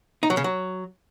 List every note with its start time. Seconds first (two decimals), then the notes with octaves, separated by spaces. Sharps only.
0.23 D#4
0.30 F#3
0.37 C#3
0.44 F#3